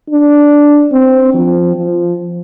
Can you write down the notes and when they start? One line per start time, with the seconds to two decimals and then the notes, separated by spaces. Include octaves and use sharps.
0.10 D4
0.92 C4
1.34 F3
1.76 F3